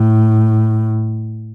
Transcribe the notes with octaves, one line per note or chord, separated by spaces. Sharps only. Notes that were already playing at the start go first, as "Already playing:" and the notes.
Already playing: A2